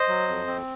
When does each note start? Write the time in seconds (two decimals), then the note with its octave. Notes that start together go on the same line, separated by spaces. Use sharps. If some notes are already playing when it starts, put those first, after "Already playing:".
Already playing: C5 D#5
0.08 F#3
0.28 F2
0.47 C4